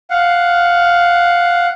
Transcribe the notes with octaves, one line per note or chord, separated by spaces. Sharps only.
F5 F#5